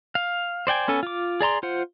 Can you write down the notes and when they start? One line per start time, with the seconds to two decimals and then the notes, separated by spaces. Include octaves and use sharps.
0.15 F5
0.67 C5 D5 G5 G#5
0.88 B3 C#4 A4 G#5
1.03 F4 D6
1.41 G#4 D5 A#5 C6
1.63 F4 C5 F#5